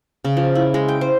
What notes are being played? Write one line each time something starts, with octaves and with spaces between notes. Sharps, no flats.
C#3
F3
E4
G#3
G5
C5